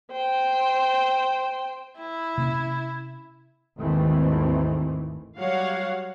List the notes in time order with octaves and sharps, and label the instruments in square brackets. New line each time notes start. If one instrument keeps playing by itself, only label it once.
[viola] C5 G5
[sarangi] E4
[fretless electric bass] C3 A#3 C#4
[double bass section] G#1 D#2 D#3 E3 A3 C4
[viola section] F#3 G3 C#5 F5 F#5